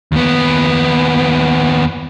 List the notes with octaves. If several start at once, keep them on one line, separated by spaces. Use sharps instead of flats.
D#2 B3